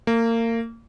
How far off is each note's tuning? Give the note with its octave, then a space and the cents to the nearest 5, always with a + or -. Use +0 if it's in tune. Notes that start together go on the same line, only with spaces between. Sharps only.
A#3 -30